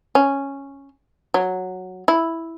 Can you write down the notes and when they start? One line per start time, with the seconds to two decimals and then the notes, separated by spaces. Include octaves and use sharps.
0.15 C#4
1.34 F#3
2.08 E4